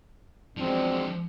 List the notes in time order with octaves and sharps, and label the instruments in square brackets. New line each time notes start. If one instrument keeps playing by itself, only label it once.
[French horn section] E2 F#3 D4 [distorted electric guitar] F3 G#3 [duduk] C4